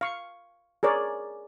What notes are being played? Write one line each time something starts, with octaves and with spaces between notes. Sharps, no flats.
F5 C#6
G#4 A#4 C#5 D5